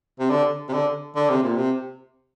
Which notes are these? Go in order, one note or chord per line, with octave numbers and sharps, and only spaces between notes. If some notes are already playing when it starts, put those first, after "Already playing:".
C3
D3
C3
D3
D3
C3
A#2
C3